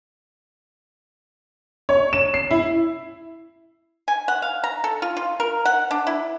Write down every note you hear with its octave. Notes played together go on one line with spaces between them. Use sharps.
C#5
E7
C7
E4
G#5
F#5
F5
A#5
A4
F4
F4
A#4
F#5
D4
E4